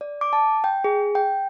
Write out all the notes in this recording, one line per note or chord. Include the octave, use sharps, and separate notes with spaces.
D5
D6
A5
G5
G#4
G5